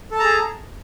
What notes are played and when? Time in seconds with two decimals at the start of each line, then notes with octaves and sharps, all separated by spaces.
0.11 A4
0.15 A5
0.19 A#5
0.23 G#4